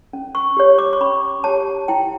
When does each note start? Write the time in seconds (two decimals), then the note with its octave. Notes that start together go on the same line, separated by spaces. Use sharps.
0.13 C#4
0.35 C#6
0.57 G4 C#5
0.79 D6
0.93 C#6
1.01 C#4 B5
1.44 G4 C#5 A5
1.88 E4 G5